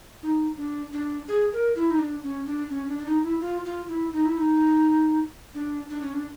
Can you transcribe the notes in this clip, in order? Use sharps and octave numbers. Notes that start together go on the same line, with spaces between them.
D#4
D4
D4
G#4
A#4
E4
D#4
D4
C#4
D4
C#4
D4
D4
D#4
E4
F4
F4
E4
D#4
E4
D#4
D4
D4
C#4
D4